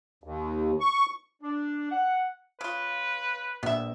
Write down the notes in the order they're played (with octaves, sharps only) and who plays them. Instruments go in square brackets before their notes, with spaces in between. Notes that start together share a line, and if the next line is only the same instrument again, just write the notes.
[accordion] D#2
C#6
[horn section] D4
F#5
[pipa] C#3 F4 [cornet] B4
[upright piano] A#1 [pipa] B3 E5